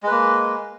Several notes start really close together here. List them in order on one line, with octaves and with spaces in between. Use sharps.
G#3 B4 A#3